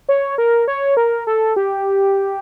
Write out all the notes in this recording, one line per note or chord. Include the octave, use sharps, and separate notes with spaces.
C#5
A#4
C#5
A#4
A4
G4